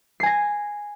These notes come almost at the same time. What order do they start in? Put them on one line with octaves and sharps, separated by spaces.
C7 G#5 A#6